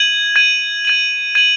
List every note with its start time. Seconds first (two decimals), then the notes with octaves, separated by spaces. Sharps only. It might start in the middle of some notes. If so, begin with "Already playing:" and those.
Already playing: G#6 D#7 F#7
0.36 G#6 D#7 F#7
0.85 G#6 D#7 F#7
1.35 G#6 D#7 F#7